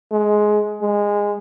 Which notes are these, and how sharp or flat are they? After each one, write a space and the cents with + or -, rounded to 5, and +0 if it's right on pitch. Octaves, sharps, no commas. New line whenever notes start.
G#3 +15
G#3 -15